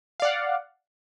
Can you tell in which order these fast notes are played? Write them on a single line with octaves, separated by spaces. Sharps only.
F5 D5 F#5